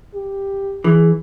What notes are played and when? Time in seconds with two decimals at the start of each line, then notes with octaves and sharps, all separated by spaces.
0.14 G4
0.84 E3 G#4